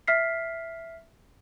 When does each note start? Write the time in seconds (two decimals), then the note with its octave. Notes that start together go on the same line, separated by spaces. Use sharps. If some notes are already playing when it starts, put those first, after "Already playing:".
0.08 E5 F6 B6 C7